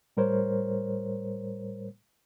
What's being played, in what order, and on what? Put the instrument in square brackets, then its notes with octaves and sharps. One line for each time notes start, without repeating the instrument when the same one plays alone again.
[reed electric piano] A2 G3 A#4 C5 C#5